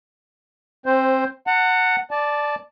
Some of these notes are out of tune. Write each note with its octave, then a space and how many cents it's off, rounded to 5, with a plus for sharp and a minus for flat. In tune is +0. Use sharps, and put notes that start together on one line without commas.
C4 +20 C5 +0
F#5 +0 A5 +45
D5 +5 A5 -15